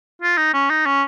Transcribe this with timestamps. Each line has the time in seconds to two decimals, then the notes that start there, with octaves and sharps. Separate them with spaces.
0.22 F4
0.38 D#4
0.54 C#4
0.70 D#4
0.86 C#4